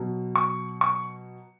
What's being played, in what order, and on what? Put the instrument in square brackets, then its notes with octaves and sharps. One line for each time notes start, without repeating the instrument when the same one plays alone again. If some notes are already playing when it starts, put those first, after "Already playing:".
Already playing: [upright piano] B2 F#3
C#6
C#6